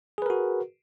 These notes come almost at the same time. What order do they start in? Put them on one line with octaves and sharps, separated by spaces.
G#4 B4 A#4 F#4